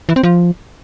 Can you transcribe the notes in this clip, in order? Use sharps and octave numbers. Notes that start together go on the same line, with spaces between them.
E3
C4
F3